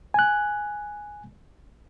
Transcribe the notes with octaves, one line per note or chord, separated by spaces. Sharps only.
G#5 F#6